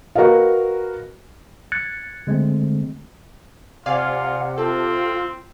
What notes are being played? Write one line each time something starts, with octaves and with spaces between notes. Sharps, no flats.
F#4 A#4 B4 D#5 F5
F#6 G#6 A6 C#7
D3 G#3 A3 C4
C3 F4 D5 F5 F#5 G#5
C4 F4 A4